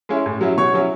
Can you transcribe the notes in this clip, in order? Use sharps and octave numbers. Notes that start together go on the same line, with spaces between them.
G#3 C#4 E4
A2
F#3 C#4 E4
B2 C#5 C#6
F#3 C#4 E4